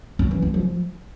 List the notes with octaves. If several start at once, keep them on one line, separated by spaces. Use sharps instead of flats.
C#4
E3
C#4
F3